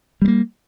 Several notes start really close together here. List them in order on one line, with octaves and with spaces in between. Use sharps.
G3 G#3 A#3